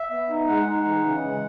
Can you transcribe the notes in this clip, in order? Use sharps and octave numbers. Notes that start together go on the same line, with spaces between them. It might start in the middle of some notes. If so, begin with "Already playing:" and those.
Already playing: E5
B3
D#4
G#3 F#5
D#4
E3
C#3
G#3